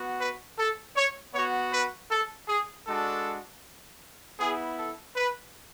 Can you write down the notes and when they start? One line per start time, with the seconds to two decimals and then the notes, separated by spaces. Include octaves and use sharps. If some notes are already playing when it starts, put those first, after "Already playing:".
Already playing: B3 F#4
0.20 B4
0.58 A4
0.96 C#5
1.34 B3 F#4 C#5
1.73 B4
2.11 A4
2.48 G#4
2.87 G#3 D4 F#4 A4
4.40 B3 E4 G#4
4.78 A4
5.16 B4